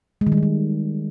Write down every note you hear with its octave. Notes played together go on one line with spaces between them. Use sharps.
G#3
D#3
G3
D#3
G3